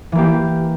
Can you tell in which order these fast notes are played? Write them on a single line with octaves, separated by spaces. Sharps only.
E3 A#3 G4